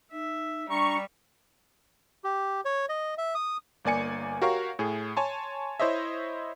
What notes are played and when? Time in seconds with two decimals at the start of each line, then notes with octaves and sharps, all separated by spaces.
0.12 D#4 E5
0.70 G3 D4 A#5 C#6
2.24 G4
2.65 C#5
2.89 D#5
3.18 E5
3.35 D#6
3.85 G1 A#3 D5 G#5 C#7
4.42 F#4 G4 A#4 C#5 F5 C#6
4.79 A2 G#4
5.17 C#5 G#5 A5 C6
5.80 E4 C5 C#5 D#5 E5